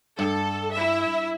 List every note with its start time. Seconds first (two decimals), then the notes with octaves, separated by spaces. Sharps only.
0.19 G2 A4
0.73 E4 E5